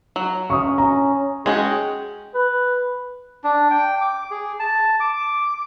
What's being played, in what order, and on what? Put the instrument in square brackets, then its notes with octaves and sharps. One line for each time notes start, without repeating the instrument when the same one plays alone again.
[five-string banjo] F#3
[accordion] C#4 [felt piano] C#6 D#6
[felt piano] A#5
[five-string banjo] G#3 C#4 F#4 [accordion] G#4 G5
[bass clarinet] B4
[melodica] D4
G5
D6
G#4
A5
D6